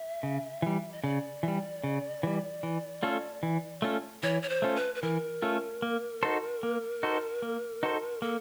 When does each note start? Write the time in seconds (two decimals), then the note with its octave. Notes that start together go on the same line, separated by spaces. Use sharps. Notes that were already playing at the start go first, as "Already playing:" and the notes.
Already playing: E5
0.23 C#3
0.62 E3 G3
0.92 D#5
1.03 C#3 D5
1.43 E3 G3
1.84 C#3
2.23 E3 G3
2.63 E3
3.03 A3 C#4 F4 A4
3.43 E3
3.82 A3 C#4 F4 A4
4.23 E3 C#5
4.43 C#5
4.49 C5
4.62 A3 C#4 F4 A4
4.76 B4
4.95 B4
5.02 E3 A#4
5.42 A3 C#4 F4 A4
5.82 A#3
6.23 D#4 F#4 A4 C5
6.63 A#3
7.03 D#4 F#4 A4 C5
7.42 A#3
7.83 D#4 F#4 A4 C5
8.22 A#3 A4